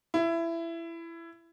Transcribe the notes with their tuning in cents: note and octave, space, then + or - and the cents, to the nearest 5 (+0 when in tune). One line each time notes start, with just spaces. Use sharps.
E4 +20